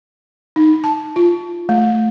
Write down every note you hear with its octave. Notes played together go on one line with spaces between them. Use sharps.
D#4
A5
F4
A3